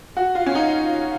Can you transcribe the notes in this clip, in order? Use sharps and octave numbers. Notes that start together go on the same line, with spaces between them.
F#4
F4
C#4
D#4